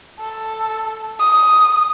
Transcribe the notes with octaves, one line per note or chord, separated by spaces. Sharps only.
A4
D#6